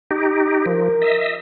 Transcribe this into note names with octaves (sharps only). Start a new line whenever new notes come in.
D#4 G4
F3 A#4
D#5 E5